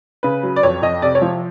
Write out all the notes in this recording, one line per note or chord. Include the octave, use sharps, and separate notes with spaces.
C#3 B4
F#3
D5
F2 C#5
F2 D#5
C3 D5
C#5
F3